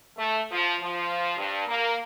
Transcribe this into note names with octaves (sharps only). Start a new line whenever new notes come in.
A3
F3
F3
G2
A#3